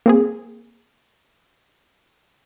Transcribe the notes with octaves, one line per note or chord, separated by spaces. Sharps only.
A#3 C4 G#4